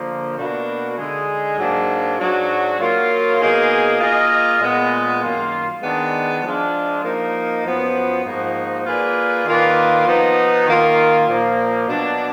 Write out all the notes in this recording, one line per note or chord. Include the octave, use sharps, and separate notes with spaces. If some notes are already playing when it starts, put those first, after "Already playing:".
Already playing: D3 F3 A#3
B2 A#3 D4 F#4 B4
D3 G#3 D#4 G#4
G#2 F#3 A#3 D4
G#2 F#3 D4 F#4
F#3 A#3 F4
B2 A#3 D#4 G#4
A#3 F4 G#4 D#5
A#2 G#3 B3
F#2 D#3 A#3 F4
D#3 G#3 B3 D4
F3 G#3 D4 F4
F3 A#3 D#4
F#2 F3 B3 F4
G#2 F3 A#3 D#4 F#4
A#3 F4 G#4 B4 D5
D#3 A#3 F4 B4 D5
F3 B3 D#4
D#3 A#3 F4 A#4
A#2 F3 A#3
B2 F#3 D4